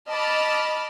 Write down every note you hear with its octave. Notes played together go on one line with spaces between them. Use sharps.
D#5 A5 B5 D6 F6 A6